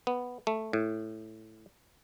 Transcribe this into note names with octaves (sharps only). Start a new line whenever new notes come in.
B3
A3
A2